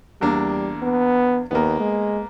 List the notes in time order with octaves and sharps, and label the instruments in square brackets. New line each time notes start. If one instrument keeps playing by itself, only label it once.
[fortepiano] E2 A#3 D4 [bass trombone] G3
[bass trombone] B3
[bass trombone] D#2 [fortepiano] A#3 B3
[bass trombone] G#3